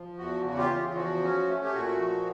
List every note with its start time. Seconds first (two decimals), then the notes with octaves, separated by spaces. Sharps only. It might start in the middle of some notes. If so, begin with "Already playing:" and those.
Already playing: F3
0.18 E2 F#4
0.44 C#3 F#4
0.57 F4 G4
0.70 E2
0.86 F4
0.95 F3 F#4
1.23 C#4
1.47 A3
1.64 G4
1.74 A#2 F#4
1.99 F3